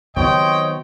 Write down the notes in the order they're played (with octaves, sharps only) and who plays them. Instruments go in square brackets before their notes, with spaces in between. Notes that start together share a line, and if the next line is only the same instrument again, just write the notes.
[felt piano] C3 F#3 B3 [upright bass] D#3 [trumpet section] C5 C#5 D#5 [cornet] G5